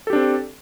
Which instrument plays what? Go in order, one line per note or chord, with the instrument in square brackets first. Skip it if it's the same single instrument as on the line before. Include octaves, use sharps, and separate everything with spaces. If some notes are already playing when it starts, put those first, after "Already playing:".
[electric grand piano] A4
G4
D4
C4